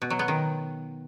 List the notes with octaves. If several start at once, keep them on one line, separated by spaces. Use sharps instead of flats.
B2
F#3
B3
D#3